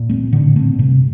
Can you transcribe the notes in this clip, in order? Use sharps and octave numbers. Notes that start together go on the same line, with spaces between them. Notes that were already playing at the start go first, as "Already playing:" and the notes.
Already playing: A#2
A3 C4
A2 D3
A3 C4
G2 C3